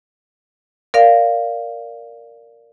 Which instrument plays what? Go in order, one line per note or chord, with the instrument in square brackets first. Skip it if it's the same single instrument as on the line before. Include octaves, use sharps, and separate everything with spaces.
[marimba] A#4 D5 F5